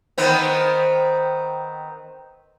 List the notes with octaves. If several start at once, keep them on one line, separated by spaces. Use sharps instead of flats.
D#3 B3 C4